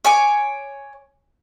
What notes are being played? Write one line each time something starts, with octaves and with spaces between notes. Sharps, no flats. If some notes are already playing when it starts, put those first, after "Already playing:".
C#5 G#5 D6